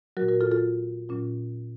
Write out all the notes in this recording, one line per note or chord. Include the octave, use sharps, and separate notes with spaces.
A#2 F#3 F#4 A#4
F#4 A#4
F4 A4
F4 A4
A#2 F#3 C#4 F4